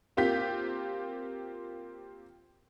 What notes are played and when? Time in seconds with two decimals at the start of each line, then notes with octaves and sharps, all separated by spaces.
0.17 A#3 C4 F4 G4 G6 B6